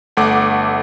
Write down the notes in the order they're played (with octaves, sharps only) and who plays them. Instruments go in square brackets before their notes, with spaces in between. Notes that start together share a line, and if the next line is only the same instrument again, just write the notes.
[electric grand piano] G1 A3 F#5 D6